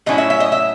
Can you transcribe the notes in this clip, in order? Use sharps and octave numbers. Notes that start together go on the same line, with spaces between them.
A2 F#3 C#4 E4 D#5
E5
E5
D#5
E5